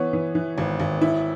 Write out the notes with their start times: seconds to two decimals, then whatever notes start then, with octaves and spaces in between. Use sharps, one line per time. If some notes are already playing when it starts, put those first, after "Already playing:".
Already playing: E3 B3 C#5
0.13 E3
0.35 E3
0.58 G#1
0.80 G#1
1.01 E4